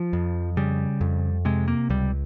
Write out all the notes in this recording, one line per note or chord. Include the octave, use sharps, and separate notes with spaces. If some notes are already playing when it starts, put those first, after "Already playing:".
Already playing: F3
F2
C#3 G3
F2
C3 G#3
A#3
C#2 G3